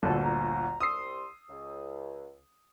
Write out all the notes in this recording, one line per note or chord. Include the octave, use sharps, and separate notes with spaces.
G1 D2 A#2 A4
A#5
C2 C6 D#6 E6 C7
C#2